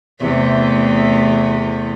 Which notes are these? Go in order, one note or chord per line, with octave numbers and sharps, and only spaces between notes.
E2 C3 A3